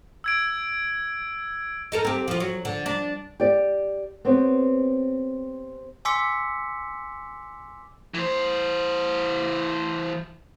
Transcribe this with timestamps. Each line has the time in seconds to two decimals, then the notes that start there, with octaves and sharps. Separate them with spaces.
0.24 E6 G#6 D7
1.92 D#4 A4 A#4
2.05 C4 G4
2.28 F3 F4
2.40 F#3
2.65 D3
2.86 D4
3.40 G4 D5
4.25 B3 C4 G4 C#5
6.05 G#5 C6 D6 E6 B6 C#7
8.14 E3 C5